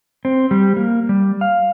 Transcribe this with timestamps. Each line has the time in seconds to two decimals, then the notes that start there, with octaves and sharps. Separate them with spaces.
0.25 C4
0.51 G3
0.77 A#3
1.09 G3
1.41 F5